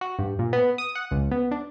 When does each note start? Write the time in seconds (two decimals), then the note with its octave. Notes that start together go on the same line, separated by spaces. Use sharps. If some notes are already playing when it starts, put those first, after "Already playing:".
0.01 F#4
0.19 G2
0.39 A#2
0.53 B3
0.78 D#6
0.95 F#5
1.11 C#2
1.31 B3
1.51 D4